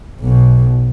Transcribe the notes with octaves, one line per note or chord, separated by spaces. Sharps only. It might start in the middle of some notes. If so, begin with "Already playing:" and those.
B1 B2